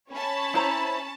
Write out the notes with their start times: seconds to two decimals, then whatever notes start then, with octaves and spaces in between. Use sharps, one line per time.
0.12 C#4 C#5 A5 B5
0.54 E4 C5 A#5